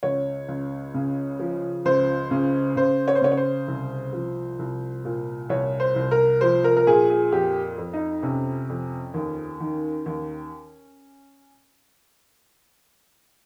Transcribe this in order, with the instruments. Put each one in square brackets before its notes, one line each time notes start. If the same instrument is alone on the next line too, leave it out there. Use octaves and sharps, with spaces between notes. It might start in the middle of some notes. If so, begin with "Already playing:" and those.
[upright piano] C#2 C#5
C#2
C#3
F3
C#2 C5
C#3
C#3 C5
C#5
C5
C#3 C#5
C#5
C5
C2
F3
C2
A#2
C2 C#5
C5
C2
A#4
F3 C5
A#4
A#4
A#2 G#4
G#4
F2 G4
F2
D#4
C3 C#4
F2
D#2
D#3
D#2